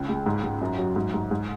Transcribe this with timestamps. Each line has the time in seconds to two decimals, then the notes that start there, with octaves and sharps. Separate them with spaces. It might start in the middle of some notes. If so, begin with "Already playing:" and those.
Already playing: C#2
0.09 G#3
0.26 G#2
0.43 G#2
0.61 F#2
0.78 F#3
0.96 G#2
1.14 G#2
1.31 G#2